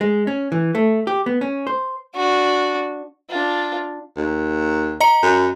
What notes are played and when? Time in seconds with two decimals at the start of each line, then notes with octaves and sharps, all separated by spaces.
0.01 G#3
0.27 C#4
0.52 E3
0.75 A3
1.07 G4
1.26 B3
1.41 C#4
1.67 C5
2.16 D4 F#4
3.29 D4 F4
4.16 D#2
5.00 D#5 A#5 C#7
5.22 F#2